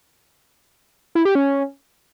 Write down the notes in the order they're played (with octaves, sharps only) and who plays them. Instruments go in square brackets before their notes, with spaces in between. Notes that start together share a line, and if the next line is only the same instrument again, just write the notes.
[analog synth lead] E4
G4
C#4